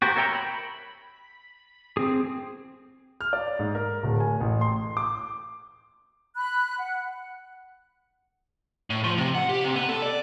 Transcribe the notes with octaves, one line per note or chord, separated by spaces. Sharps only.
F#4 G4 A#4 C5
A#4 C#5 E5 G5 A#5
B5
C4 G#4
F6
D5
G#2
A#4
D1
G#5
A1
C6
D6
B5 F#6
F#5
A2
F3
C3
F#5
G4
C3
B3
A4
D5